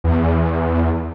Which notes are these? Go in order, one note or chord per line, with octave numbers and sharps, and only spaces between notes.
E2